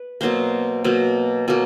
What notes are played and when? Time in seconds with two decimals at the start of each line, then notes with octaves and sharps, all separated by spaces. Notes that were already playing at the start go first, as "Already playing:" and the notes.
Already playing: B4
0.21 B2 F#3 A#3 C5
0.84 B2 F#3 A#3
1.48 B2 F#3 A#3